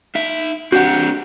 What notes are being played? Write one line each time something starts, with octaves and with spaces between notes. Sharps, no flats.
D#4 E5
C4 D4 F#4 G4 F#5 G6